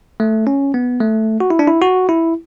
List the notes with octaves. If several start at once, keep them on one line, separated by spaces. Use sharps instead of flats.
A3
C#4
B3
A3
F#4
E4
D4
E4
F#4
E4